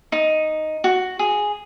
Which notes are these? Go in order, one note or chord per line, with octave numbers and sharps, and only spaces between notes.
D#4
F#4
G#4